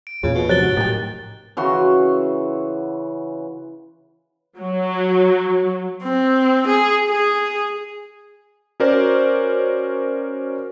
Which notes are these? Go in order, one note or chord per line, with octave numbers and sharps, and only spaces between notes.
D7
E2 A#2 C#3 F4
B2
C3 F3 F#3 F#6 A6 G7
G#2 F#3
A2 D#3 G4 G5 A6
C#3 E3 F#4 C6
F#3
C4
G#4
G#4
C#4 F#4 A#4 C5 D5